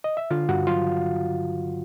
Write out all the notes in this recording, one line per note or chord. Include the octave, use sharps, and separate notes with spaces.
D#5
E5
D3 F4 F5
G2 F#4 F#5
F#3 F4 F5